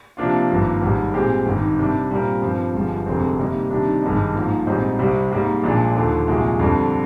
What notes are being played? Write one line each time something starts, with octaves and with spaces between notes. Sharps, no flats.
C3 F3 A#3 D4 F4
G#1 G2 F3 A#3
G#1 G#2 G3
A#2 G#3 C4 G4
G#1 G2 D#3
C3 G3 D4 G4
A#2 G3 C4 F4 A#4
G2 F3 C4
G1 G2 F3 G#3
F1 F2 D3 G#3 C4
C3 G3 A#3 D#4
C3 D#3 G3 D4
G#1 G2 D#3 G#3 D#4
G#2 F3 A#3
A#1 G#2 G3 C4 D#4
C2 C3 G3 C4
G#2 G3 A#3
A#1 A#2 F3 G#3 D4
D#2 D3 F3
C2 A#2 F3 G#3
F2 D3 G3 D4